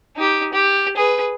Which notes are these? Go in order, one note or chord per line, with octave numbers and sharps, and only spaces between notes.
D#4 G4
G4
G#4 B4